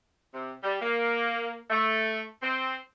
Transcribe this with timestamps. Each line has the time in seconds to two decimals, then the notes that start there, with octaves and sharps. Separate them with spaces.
0.34 C3
0.64 G3
0.81 A#3
1.70 A3
2.42 C4